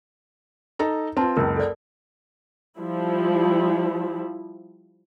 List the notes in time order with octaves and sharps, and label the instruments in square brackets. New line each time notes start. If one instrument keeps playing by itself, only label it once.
[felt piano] D#4 A4 A#5
[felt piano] C4 F4 [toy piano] B4 A5
[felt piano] F#1 C#2 [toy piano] A#4
[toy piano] A4 D5
[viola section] F3 G3 E4